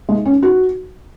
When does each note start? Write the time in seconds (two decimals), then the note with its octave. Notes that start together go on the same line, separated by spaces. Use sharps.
0.09 G#3
0.25 C#4
0.43 F#4